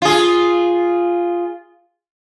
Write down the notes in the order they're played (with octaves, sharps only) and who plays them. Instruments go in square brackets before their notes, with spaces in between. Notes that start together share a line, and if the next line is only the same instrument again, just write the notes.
[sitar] F4 G#4